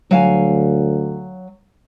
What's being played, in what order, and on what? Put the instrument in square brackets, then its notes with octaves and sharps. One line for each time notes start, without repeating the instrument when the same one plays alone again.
[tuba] D2 [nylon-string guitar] F#3 F5 G#5